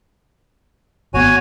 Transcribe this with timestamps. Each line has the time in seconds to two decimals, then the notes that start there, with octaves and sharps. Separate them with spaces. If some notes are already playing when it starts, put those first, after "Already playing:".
1.14 G#1 B3 F#4 C#5 G#5